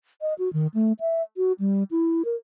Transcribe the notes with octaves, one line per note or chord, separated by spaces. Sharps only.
D#5
F#4
D#3
A3
E5
F#4
G3
E4
A#4